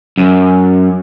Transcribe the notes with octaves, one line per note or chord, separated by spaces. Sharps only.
F#2